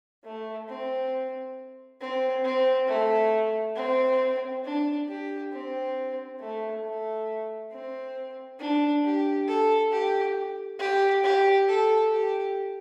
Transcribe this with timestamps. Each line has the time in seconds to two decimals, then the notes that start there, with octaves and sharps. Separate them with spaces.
0.24 A3
0.69 C4
2.01 C4
2.44 C4
2.88 A3
3.76 C4
4.64 D4
5.09 G4
5.52 C4
6.40 A3
6.84 A3
7.71 C4
8.59 D4
9.04 G4
9.48 A4
9.91 G4
10.79 G4
11.24 G4
11.68 A4
12.11 G4